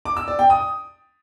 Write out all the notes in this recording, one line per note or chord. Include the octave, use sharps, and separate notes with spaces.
D6
E6
D5
G5
D#6